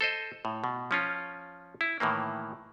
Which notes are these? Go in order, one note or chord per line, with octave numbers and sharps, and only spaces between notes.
A4 C5 D#5
A2
B2
F3 C#4 F4
E4
A2 D#3 E3 A#3